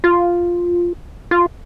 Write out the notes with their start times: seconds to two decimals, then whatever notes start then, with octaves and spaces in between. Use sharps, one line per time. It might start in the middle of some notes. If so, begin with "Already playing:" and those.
0.04 F4
1.31 F4